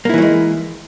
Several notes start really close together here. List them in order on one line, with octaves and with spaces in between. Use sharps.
A#3 E4 E3 F#3 G#3